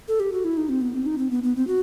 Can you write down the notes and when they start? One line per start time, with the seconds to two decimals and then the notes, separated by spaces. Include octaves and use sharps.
0.08 A4
0.20 G4
0.32 F#4
0.44 E4
0.57 D#4
0.69 C4
0.81 B3
0.93 C4
1.06 D#4
1.18 C4
1.30 B3
1.43 B3
1.56 C4
1.67 F#4